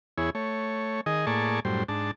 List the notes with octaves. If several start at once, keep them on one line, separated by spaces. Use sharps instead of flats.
E2 E4 G#4 C#5
A3 C#5
D#3 G#4 D#5
A2 A#3 G#4 D5 A5 C#6
F#2 A2 G3 C5
G#2 D4 A5